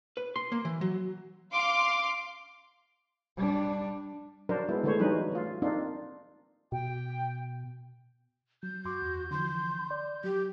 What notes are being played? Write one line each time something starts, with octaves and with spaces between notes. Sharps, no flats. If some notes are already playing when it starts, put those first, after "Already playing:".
B4
C6
A#3
E3
F#3
F5 C6 D6
G3 D4
F#3 D4 A#4 C5
G#3 B3 E4
D3 E3 G#3 A3 C5 C#5
E3 F#3 G3 C#4 D#4 B4
A3 F4
A#3 C4 D4 D#4 F4
B2 G5
F#3 G6
F#2 F#4 C6 D6
E2
D3 E3 F3 C6
D5
F#3 G4